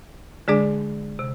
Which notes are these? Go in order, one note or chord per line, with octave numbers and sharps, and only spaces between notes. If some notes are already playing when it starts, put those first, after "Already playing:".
D3 G#3 D4 G#4 D5
C3